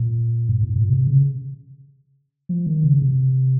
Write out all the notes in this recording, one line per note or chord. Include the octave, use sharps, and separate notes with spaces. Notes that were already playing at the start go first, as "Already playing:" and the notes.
Already playing: A#2
G2
G#2
A#2
C3
C#3
F3
D#3
C#3
C3